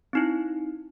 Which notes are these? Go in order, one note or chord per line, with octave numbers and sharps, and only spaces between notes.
C4 D#4 E4